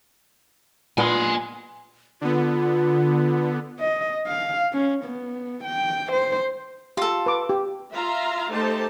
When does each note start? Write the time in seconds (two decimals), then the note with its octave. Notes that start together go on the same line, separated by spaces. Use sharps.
0.98 A#2 B3 D4 G#5 C6
2.21 D3 B3 F4
3.79 D#5
4.27 F5
4.73 C#4
5.05 B3
5.64 G5
6.12 C5
6.97 F4 G4 A4
7.26 B4 D6
7.49 G4
7.93 F4 E5 F5 A#5
8.51 A3 D#4 G4 A4 C5 A5